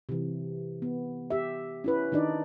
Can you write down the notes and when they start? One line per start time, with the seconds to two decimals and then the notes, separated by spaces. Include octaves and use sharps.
0.09 C3 E3
0.82 B3
1.30 G4 E5
1.84 C#4 E4 B4
2.12 D#3 D4 D#4 D5